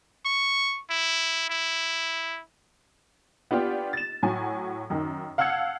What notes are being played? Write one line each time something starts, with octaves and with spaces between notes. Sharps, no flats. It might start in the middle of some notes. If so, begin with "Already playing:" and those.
C#6
E4
E4
B3 D4 F4 G4
A6 E7
A2 F#3 G#5
F#2 D#3
F5 F#5 A5 E6 G#6 C#7